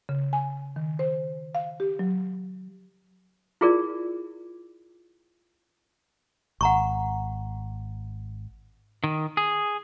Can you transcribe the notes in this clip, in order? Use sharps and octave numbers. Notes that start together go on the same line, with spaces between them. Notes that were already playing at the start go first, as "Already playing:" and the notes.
C#3
G#5
D#3
C5
F5
G4
F#3
E4 F4 G#4 A#4 D5
G#1 F#5 A#5 C#6
D#3
G#4